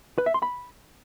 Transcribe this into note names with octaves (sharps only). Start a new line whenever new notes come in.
B4
E5
C6
B5